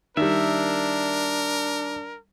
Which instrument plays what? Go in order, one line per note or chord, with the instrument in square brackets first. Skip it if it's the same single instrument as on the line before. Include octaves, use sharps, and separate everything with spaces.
[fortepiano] D#3 G3 [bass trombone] D4 [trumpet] A#4 [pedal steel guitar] E5